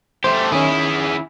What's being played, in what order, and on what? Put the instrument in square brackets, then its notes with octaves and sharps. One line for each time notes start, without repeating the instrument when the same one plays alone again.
[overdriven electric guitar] A3 G4 [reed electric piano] C5 C6
[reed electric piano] D#3 C#4 [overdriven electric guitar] E4 G#4